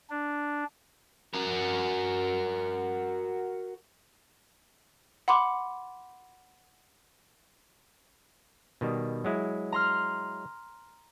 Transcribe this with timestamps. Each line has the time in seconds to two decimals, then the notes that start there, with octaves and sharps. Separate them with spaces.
0.10 D4
1.34 F#4 A#4
5.28 F#5 B5 C6 D6
8.81 B2 D#3 G3
9.25 F#3 G#3 E4
9.72 A#5 C6 F6